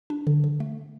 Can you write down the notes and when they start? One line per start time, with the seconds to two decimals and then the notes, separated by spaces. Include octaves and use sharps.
0.10 D4
0.27 D3
0.44 D3
0.60 A3